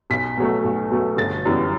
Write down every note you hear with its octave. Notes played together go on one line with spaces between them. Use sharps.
B1 B6
B2 F#3 A3
B1
B2 F#3 A3
G1 A6
F#2 E3 G3 B3